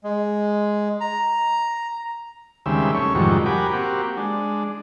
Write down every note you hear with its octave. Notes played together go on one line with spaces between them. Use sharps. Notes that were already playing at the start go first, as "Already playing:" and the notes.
G#3
A#5
D#2 C#3 G3 G#3 C4 E5
A3 C#4 C#5
F2 G#2 C3 D#3 F#3 G3
F#4 G4 A#4 G#5 B5 D6
A#3 C4 F#4 G4
G#3 D4